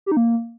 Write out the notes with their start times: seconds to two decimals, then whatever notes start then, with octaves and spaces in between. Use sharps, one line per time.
0.06 G4
0.12 D#4
0.17 A#3